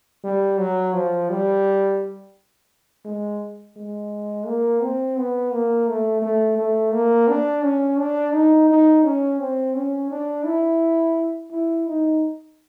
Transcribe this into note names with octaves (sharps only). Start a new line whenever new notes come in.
G3
F#3
F3
G3
G#3
G#3
A#3
C4
B3
A#3
A3
A3
A3
A#3
D4
C#4
D4
D#4
D#4
C#4
C4
C#4
D4
E4
E4
D#4